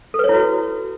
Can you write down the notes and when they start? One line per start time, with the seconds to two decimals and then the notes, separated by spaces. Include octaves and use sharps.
0.14 A4
0.19 B4
0.24 C#5
0.29 E4
0.34 F#4